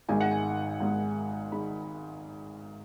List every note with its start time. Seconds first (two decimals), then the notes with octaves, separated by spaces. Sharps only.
0.09 G#1 G#2 D#3 G#3 G#5
0.21 F#5
0.31 G#5
0.80 G#1 G#2 D#3 G#3
1.52 D#3 G#3 B5